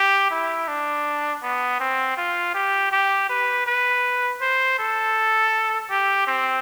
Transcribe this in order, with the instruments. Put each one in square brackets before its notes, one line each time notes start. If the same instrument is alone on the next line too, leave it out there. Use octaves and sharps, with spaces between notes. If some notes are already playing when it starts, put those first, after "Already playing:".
Already playing: [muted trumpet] G4
E4
D4
B3
C4
F4
G4
G4
B4
B4
C5
A4
G4
C4